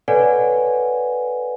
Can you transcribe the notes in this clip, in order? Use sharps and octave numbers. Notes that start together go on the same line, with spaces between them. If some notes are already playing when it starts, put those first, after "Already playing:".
A4 B4 C#5 D5 F#5 G#5